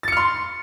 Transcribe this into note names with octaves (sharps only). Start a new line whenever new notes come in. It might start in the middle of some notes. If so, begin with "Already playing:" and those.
C6 F6 A6 C#7